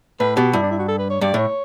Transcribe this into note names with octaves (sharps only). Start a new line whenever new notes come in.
A2 B4
B2 G4
G2 E4
D4
E4
F#4
A4
B4
C#5
G2 D5
A2 C#5